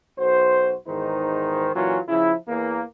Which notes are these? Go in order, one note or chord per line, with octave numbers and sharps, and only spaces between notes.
B1 F#4 C5
E2 G#2 D#3 D#4 C5
A#2 E3 F#3 C#4 F4
C#3 F3 E4
E2 E3 A#3